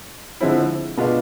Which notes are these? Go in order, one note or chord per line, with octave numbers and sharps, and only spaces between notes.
D3 F3 G#3 C4 E4
B2 G#3 B3 D4 F4